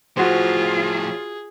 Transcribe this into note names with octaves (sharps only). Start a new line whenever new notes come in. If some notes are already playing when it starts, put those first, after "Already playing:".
A2 F3 F4 F#4 G#4 C5